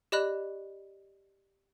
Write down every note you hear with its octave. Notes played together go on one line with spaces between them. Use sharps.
G4 D5 D#5 B5 F#6